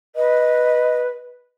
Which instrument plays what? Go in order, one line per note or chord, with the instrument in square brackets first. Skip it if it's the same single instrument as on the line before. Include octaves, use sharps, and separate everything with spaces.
[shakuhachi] B4 [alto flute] D#5